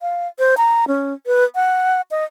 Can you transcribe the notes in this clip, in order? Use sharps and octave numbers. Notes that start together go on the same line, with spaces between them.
F5
C5
A#5
C#4
B4
F#5
D#5